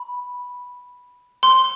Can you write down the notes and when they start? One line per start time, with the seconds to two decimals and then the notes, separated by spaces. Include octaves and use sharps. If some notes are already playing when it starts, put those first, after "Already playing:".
Already playing: B5
1.43 C6